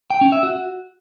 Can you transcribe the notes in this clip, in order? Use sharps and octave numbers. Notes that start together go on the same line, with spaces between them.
G5
C#4
E5
F#4